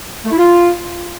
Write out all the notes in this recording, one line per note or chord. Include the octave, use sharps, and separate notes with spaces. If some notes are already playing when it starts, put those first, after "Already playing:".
A3
E4
F4